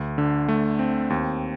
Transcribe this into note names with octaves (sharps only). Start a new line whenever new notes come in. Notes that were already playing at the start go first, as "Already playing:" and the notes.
Already playing: D2
D3
A3
C4
D#2